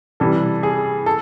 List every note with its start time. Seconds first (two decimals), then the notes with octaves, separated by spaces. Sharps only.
0.20 C3 E3 G3 A4
0.63 G#4
1.06 A4